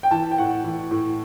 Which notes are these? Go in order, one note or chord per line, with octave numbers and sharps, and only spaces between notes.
G5
E3 A5
G5
A2 F#5
E3
A2